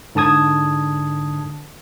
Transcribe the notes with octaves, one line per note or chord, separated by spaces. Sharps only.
G#2 D3 A5 D#6 G#6